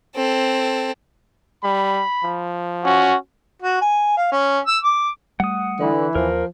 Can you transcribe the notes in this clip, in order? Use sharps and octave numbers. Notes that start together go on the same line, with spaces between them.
C4 A4
G3 B5
F3
C#4 F#4
F#4
G#5
F5
C#4
E6
D6
G3 A3 F#5 D#6
D3 E3
D#2 F3 A#4